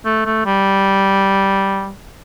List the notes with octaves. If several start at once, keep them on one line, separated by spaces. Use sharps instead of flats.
A3
A3
G3